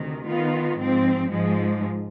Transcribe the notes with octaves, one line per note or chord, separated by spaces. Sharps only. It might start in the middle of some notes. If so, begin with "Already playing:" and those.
Already playing: D2 C3 D#3
D#3 B3 F4
G#2 F3 C4
G#2 F3 G#3